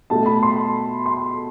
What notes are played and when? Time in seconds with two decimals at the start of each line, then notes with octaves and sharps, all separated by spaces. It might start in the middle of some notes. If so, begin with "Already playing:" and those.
0.10 B2 A3 A5
0.26 B5
0.43 C6
1.06 C6